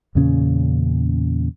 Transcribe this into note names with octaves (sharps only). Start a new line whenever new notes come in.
E2 A#2 C#3 C#4